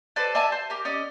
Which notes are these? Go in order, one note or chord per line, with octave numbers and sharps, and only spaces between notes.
A4 B4 C5 D5
D5 E5 G#5 A5
C5
G4 A#4
C#4 D5 D#5 D#6